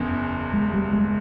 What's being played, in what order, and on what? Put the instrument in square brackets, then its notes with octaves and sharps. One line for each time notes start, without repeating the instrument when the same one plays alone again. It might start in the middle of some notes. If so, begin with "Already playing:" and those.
Already playing: [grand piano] F#1 E2 C#3
[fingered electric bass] G#3
G3
G#3